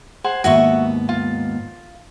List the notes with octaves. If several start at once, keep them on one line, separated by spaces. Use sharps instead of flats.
G#4 C5 F#5
D#2 G#2 B3 F#4 E5 C#6
F4